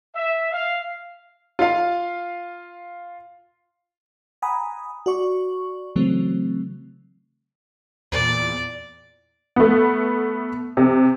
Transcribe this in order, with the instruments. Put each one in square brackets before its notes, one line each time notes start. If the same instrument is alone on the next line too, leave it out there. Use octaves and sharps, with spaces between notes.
[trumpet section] E5
F5
[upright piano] F4 F5
[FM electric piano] F#5 G#5 A#5 B5 D#6
F#4 D5 C#6
C#3 E3 F#3 A3 C4
[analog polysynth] E2 A#2 [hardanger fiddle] D5
[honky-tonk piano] A3 B3
C3